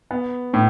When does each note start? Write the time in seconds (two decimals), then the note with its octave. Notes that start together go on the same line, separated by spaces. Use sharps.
0.11 B3
0.54 A2